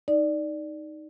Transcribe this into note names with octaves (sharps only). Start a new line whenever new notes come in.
D#4 D5